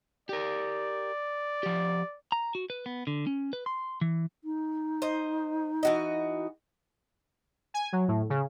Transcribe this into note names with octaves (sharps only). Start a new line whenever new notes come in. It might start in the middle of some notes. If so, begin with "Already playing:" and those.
G4 A#4 D5
F3 G4
A#5
F#4
B4
B3
D3
C#4
B4
C6
E3
D#4
C5 D#5
E3 F#4 D#5
G#5
F#3
A2
C#3